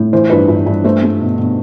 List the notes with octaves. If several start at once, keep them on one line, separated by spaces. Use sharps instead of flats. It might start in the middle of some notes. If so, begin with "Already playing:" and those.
Already playing: A2
E3 C5
G2 B4
G2
G2
A3 C5
A3
B2
B2